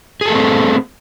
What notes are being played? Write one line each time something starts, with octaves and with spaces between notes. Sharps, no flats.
A3 C4 G#4 A4